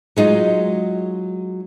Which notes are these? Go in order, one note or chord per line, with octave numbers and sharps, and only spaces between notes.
F#3 G#3 D#4 F4